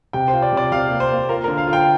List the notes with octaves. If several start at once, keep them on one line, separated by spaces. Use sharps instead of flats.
C3 G5
C5
F4
D5
C3 D5
C3 F5
A#3
C5
A#3
F4 A#4
D3 A#4
F5
F4
G5